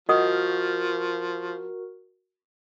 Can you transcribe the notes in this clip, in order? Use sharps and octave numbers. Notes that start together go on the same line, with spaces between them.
F3 F#4 A#4 D#5 F#5 D#6